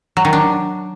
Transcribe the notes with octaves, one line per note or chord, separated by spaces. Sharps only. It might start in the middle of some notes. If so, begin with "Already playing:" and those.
F#3
D#3
D4